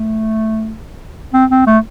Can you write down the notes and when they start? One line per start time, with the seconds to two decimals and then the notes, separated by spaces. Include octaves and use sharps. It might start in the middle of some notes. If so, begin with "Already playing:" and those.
Already playing: A3
1.33 C4
1.50 C4
1.67 A3